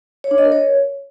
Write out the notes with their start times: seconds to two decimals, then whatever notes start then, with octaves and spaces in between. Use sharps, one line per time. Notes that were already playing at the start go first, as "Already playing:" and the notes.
0.24 C#5
0.31 D4
0.38 D#5
0.45 A#4
0.52 C#5